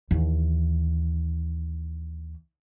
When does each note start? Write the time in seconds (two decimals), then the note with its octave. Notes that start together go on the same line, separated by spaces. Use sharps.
0.11 D#2 E3